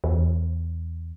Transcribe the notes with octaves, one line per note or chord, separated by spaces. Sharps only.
E2